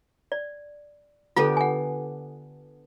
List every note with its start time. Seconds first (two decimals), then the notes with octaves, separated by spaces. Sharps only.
0.32 D5
1.36 D3 B3 F4 G4 A4
1.57 F#5 G#5